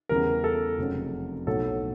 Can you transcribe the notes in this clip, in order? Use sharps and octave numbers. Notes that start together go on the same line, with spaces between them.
E2 C#3 E3 G3 A#4
A4
F1 F2 C#3 F#3
B1 A2 F#3 A4